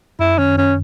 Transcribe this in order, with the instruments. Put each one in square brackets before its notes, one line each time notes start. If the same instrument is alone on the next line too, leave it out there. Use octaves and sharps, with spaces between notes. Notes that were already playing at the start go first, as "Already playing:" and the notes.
[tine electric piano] F#2 [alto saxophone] E4
[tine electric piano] D#3 [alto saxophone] C#4
[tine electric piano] F#2 [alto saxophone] C#4